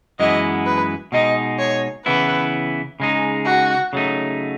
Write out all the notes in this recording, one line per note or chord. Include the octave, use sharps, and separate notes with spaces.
F#2 E3 G#3 B3 E4 D#5
B4
B2 G#3 D#4 D#5
C#5
C#3 E3 B3 E4 B4
C#3 G#3 D#4
F#4
C#3 F#3 A3 D#4